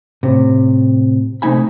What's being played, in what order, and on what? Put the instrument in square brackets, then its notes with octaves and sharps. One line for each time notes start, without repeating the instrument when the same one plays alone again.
[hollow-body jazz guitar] A2 C3
C3 A3 D#4 G#5 B5